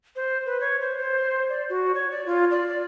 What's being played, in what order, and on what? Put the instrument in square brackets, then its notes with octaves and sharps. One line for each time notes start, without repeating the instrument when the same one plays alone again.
[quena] C5
B4
C#5
C5
C5
D5
F#4
C#5
D5
F4
D5
D5